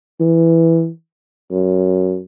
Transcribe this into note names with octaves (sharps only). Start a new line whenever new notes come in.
E3
F#2